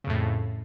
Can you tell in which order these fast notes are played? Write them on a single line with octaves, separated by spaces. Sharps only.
C#3 F2 A2